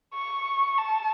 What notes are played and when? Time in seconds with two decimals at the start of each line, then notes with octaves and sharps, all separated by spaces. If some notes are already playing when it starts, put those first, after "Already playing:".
0.14 C#6
0.78 A5